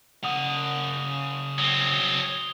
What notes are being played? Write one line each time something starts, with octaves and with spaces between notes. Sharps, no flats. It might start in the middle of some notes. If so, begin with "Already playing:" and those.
C#3 F#5 D#6 F7
F#3 C4 D#6 F7 G7